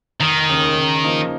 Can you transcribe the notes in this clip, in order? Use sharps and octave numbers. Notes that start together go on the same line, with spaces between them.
F1 D#3
D#2 C#3
C#3
F3 A#3 D#4